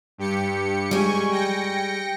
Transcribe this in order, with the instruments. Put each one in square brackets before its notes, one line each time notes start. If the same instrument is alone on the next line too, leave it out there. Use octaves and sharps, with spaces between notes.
[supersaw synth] G2 G4 C#7
[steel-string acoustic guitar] G3 G#3 [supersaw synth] G#5 C#6
[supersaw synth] G5 A#6 C#7